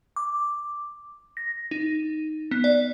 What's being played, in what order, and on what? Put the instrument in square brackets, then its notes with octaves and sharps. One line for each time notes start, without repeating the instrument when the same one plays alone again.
[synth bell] D6
A#6
D#4
B3
D5